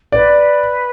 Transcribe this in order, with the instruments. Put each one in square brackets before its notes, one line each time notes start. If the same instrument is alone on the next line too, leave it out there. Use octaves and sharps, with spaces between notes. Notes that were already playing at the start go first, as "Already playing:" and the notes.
[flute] B4 [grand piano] D5